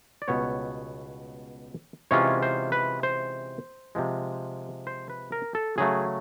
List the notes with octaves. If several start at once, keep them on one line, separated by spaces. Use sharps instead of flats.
D5
C#2 B2 G3 B3 C#5
C3 E3 G#3 C#4 F4 C#5
C5
B4
C5
C3 F3 G#3
C5
B4
A#4
A4
C#3 F#3 A3 G#4